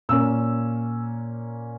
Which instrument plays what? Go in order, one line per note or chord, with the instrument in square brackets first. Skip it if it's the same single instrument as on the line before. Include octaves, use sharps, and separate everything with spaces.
[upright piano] A#2 A#3 C#4 E6